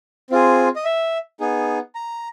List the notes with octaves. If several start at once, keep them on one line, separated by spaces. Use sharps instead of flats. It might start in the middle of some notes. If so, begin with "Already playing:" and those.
C4 F4 G#4
D#5
E5
B3 D#4 G#4
A#5